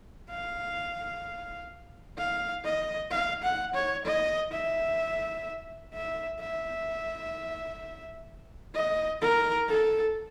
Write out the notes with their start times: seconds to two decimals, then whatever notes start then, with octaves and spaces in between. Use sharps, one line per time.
0.30 F5
2.18 F5
2.64 D#5
3.11 F5
3.43 F#5
3.74 C#5
4.05 D#5
4.52 E5
5.93 E5
6.40 E5
8.74 D#5
9.21 A#4
9.68 A4